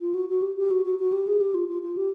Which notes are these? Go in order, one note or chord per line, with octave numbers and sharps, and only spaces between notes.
F4
F#4
F#4
G4
G4
F#4
F#4
F#4
G4
G#4
G4
F4
F4
F4
G4